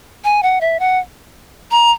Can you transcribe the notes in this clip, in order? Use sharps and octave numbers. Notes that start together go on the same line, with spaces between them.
G#5
F#5
E5
F#5
A#5